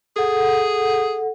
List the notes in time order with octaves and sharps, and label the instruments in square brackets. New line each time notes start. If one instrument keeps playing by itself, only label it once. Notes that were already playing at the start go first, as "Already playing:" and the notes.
[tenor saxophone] G#4 [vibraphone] A4 F#5